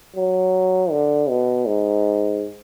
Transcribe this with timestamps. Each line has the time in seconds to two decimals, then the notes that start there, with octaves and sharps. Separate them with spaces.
0.16 F#3
0.91 D3
1.29 B2
1.67 G#2